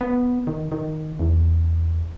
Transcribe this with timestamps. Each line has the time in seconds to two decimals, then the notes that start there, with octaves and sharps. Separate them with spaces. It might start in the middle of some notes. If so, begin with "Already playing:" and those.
0.01 B3
0.47 D#3
0.72 D#3
1.19 E2